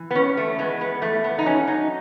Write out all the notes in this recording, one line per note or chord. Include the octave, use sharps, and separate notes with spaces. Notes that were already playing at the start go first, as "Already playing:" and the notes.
Already playing: E3
B3
E2 C#4
A3
G#3 B3
B3
E2 A3
B3
D#4
F#3 C#4
D#4